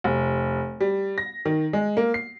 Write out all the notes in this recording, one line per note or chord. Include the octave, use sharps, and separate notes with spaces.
F1
G3
A#6
D#3
G#3
A#3
C7